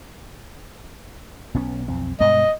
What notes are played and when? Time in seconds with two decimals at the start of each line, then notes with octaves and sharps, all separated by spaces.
1.54 B1 B3 C#4
1.88 B1 F2 C4
2.20 G2 B2 G#3 D#5